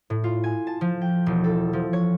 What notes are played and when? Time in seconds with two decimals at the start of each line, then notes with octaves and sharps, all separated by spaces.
0.10 A2
0.24 F4
0.44 G#5
0.67 A5
0.81 F3
1.02 G5
1.26 E1
1.44 A4
1.73 F3
1.93 C#5